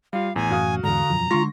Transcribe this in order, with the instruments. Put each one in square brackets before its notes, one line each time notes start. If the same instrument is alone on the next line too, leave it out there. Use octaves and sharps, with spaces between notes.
[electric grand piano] G3 F4 [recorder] F5
[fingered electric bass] A1 [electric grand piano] E2 [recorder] G#5
[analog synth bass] F#2 [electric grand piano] F#4 F5 D#6
[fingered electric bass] E2 G#2 [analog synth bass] D3 [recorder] A#5
[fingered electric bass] E1 F#2 F3
[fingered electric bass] D3 G#3 [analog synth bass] F4 [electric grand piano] C6 C#6 A#6